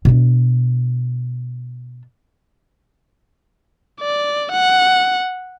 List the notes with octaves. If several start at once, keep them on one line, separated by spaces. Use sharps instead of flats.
B2 D4
D5
F#5